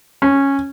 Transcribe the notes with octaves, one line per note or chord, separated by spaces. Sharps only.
C#4